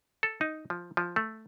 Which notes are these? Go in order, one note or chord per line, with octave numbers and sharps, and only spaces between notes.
A4
D#4
F3
F3
A3